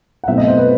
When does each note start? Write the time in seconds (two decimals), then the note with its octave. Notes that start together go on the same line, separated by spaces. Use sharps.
0.24 F#5
0.28 B2 F#3 A3 C4 E5
0.38 D#5
0.47 C5
0.57 B4